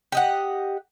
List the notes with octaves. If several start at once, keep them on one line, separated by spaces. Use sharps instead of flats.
G4 D#5 F#5